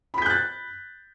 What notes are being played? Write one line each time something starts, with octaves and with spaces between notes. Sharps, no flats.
B5 F#6 G6 A6 B6